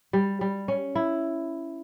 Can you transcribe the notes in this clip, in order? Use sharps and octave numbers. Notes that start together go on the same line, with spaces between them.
G3
G3
C#4
E4